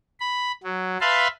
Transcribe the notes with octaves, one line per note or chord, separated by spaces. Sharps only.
B5
F#3
B4 E5 F5 A5 B5 C6